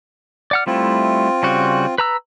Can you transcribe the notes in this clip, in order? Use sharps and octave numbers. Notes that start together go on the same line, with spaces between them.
D5 F#5 F6
G3 A3 C4 E4 F4
C#3 G3 F#4
B4 A#5 E6